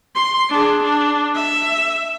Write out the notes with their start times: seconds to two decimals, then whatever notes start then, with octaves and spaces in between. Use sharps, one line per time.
0.15 C6
0.50 D4 G#4
0.84 D4
1.35 E5